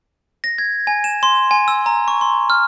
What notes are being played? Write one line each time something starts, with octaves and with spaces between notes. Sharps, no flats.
A#6
G#6
G#5
E7
C6
G#5
E6
A#5
C#6
C6
F6